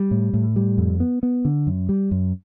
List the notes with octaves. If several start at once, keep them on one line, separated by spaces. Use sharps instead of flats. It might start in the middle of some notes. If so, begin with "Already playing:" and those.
Already playing: G3
A2
A2
G3
F2
B3
B3
D3
F#2
G3
F#2